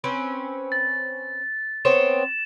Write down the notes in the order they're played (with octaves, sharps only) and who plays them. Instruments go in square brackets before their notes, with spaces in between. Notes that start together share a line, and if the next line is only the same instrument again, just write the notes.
[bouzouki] C4 C#4 B4
[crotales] A6
[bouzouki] B3 C4 C#5 [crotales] E7